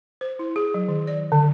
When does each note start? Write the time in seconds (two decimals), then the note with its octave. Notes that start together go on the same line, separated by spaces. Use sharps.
0.21 C5
0.39 E4
0.56 G#4
0.74 F#3
0.88 D#3
1.07 D5
1.32 D3